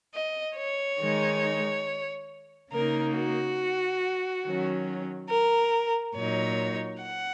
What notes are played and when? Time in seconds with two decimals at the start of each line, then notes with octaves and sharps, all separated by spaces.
0.13 D#5
0.56 C#5
0.99 D#3 G#3 D#4
2.71 C#3 A#3 D#4 A#4
3.14 F#4
4.44 D#3 F#3 C#4
5.29 A#4
6.15 A#2 F#3 D#4 C#5
7.02 F#5